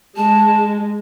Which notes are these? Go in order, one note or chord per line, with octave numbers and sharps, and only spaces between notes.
G#3 A5